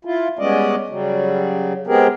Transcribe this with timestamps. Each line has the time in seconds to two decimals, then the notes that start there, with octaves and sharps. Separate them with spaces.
0.05 E4 F4
0.39 G3 G#3 B3 C#4 D5 D#5
0.89 C#3 F#3 G3
1.87 G#3 B3 C4 G4 G#4 A#4